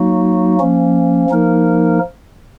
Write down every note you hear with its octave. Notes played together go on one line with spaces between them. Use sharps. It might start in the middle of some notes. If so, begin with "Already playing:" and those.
Already playing: F#3 A#3 D#4 F#4
F3 A#3 C#4
F3 A#3 D#4 A#4